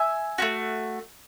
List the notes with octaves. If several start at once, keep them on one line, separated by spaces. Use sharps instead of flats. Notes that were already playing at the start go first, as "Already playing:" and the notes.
Already playing: E5 G#5
A3 C#4 F#4